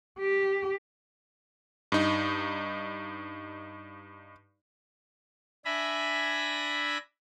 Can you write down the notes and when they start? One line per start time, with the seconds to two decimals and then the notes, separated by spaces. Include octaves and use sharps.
0.19 G4
1.92 G2 D#4
5.65 D4 E5 G#5 B5 A#6